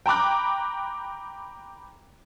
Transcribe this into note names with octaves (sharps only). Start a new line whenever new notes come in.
G5 A#5 B5 D6 F#6